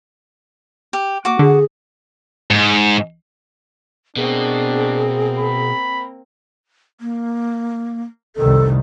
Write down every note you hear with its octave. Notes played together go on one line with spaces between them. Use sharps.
G4
A#3 F#4 D6
D3 G#4
G#2
B2 A#3 C4 D4 G#4
B5
A#3
F1 C2 D#3 A4